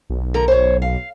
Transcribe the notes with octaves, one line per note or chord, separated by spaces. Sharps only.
B1
D3 A#4 A#5
C5 C#5
F5